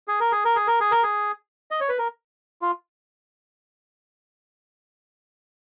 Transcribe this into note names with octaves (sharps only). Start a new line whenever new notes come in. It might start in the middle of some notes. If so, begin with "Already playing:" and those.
G#4
A#4
G#4
A#4
G#4
A#4
G#4
A#4
G#4
D#5
C#5
B4
A#4
F4